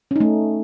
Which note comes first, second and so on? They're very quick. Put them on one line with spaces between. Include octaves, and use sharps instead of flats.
C#4 D#4 A3